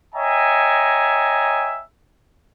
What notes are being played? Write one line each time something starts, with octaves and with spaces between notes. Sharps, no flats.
C#5 D#5 E5 G5 G#5 A#5